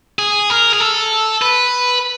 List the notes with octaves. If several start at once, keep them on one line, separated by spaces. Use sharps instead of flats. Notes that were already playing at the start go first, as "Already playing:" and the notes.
G#4
A#4
G#4
A4
B4